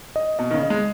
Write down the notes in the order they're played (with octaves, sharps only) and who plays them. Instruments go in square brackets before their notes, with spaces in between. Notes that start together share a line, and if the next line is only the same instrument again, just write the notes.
[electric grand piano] D#5
[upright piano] B2 [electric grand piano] D#5
[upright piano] D#3
C#3
[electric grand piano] D#5
[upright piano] G#3